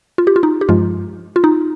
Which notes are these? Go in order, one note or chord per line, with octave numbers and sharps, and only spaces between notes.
F4
G4
F4
D#4
G4
G2 F3 G#3 F4
F4
D#4